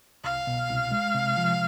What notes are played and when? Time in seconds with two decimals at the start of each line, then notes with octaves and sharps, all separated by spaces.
0.24 C2 F5
0.47 B2
0.70 C2
0.91 G#3
1.15 C3
1.37 F3